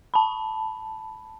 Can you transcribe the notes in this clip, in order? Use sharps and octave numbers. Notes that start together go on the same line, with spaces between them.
A5 B5